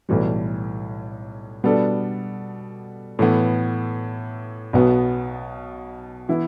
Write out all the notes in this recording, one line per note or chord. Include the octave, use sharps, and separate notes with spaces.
B1 A2 E3 G3
B2 G3 B3 D4 A4
A2 E3 B3
B1 B2 B3
E3 B3 E4